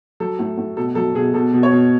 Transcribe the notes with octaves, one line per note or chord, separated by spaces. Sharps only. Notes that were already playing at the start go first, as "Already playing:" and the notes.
F#3 A4
A2
A2
B2 A4
F#3 A4
B2 G#4
B2 A4
B2
C#5
B2